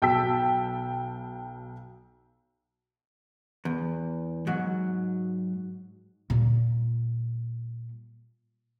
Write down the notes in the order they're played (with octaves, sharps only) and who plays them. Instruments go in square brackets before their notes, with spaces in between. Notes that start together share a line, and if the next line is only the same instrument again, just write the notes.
[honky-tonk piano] B1 G5 A5 E6 B6
[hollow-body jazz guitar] E2
G#2 F#3
[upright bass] A#2 G3